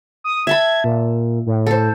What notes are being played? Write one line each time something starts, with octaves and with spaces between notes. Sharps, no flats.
D#6
E5 A5 B5 G#6
A#2
A2
A4 C5